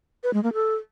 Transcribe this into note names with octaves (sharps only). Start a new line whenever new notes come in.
B4
G#3
A#3
A4